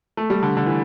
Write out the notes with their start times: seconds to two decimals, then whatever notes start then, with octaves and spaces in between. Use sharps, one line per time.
0.17 A3
0.30 G3
0.43 D3
0.57 D3
0.66 E3